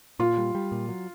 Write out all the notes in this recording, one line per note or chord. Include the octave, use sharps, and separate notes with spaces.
A#2 F4
G3
G3
A#2
F#3